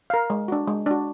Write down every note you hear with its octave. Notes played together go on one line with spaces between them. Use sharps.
A#4 F5
G#3
D4 F#4
G#3
D4 F#4